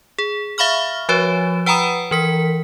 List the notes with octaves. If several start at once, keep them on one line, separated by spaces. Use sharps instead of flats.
G#4
E5 F5 B5 C#6 F6
F3 F#4 B4 C#5
B4 F#5 G5 A#5 B5 D#6
E3 A#4 B6